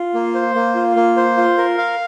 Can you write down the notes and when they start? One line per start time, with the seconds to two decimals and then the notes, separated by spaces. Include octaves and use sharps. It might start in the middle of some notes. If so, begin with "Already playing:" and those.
Already playing: F4
0.14 A#3
0.34 C5
0.55 A#3
0.75 F4
0.96 A#3
1.17 C5
1.37 F4
1.58 A#4
1.78 F5